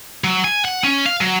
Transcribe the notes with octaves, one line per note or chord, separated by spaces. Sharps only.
F#3
G#5
F#5
C#4
F5
F#3